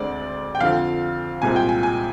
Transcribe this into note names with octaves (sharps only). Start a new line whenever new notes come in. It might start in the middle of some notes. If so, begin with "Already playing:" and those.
Already playing: D2 D3 G#3 C4 D5
G5
F2 D3 F3 C4 F5
C2 A#2 G#3 C4 G#5
G5
G#5
G#5